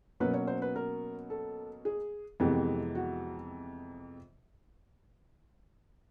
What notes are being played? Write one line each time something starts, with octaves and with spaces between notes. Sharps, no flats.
B2 F#3 A#3 C#4 B4
C#5
C5
B4
A#4
A4
G#4
F2 C3 E3 G#3 B3 G4
F#4